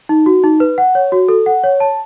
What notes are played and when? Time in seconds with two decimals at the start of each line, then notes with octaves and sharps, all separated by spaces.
0.09 D#4
0.26 F#4
0.44 D#4
0.60 B4
0.78 F#5
0.95 C#5
1.12 F#4
1.28 A4
1.46 F#5
1.63 C#5
1.80 A5